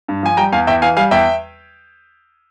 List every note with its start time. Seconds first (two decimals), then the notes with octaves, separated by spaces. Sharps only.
0.08 G2
0.23 F3 G#5
0.37 G3 G5 A#5
0.52 E2 F5 G#5
0.67 E2 E5 G5
0.82 E3 F5 G#5
0.97 G3 F5 G#5
1.11 E2 E5 G5